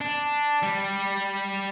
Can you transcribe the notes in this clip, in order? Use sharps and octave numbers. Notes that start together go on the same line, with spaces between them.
D4
G3